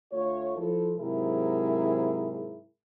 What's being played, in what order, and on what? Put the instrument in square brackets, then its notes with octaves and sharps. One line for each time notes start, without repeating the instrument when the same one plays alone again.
[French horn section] D2 A3 F4 C#5
F3 E4 A4
G#2 C3 F#3 E4 G#4 A#4